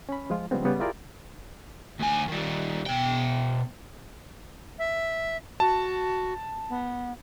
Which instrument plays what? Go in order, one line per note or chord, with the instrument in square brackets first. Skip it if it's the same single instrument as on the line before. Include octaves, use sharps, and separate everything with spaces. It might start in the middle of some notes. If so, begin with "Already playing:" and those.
[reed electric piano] C#4 B5
F3 G#3 F4
C#3 F3 G3 G#3 B3 C4
C#3 G3 B3 C#4
E4 F4 G4 G#4 A#4 D5
[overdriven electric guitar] D2 G#5
D#3 G3
B2 G5
[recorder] E5
[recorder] F#4 [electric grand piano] A5
[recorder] B3